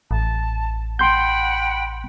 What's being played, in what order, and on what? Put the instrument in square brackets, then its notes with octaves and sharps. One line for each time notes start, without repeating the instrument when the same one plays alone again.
[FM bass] A1 [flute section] A5
[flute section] F#5 G5 B5 [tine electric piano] C6 G6